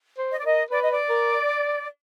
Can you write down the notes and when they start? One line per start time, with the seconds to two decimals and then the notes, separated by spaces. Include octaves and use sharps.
0.18 C5
0.31 D#5
0.39 D5
0.44 A#4 D#5
0.71 B4 D5
0.81 D#5
0.91 D5
1.09 A#4